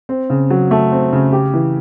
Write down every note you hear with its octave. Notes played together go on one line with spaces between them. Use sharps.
C4
C#3
F#3
A3
C4
C#3
G4
E3